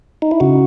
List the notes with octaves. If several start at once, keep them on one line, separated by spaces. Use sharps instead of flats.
D#4
E4
C#3 F#4